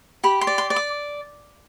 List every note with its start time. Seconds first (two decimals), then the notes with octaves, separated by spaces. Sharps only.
0.24 G4 B5
0.41 C6
0.47 D5
0.58 C6
0.70 D5
0.76 D6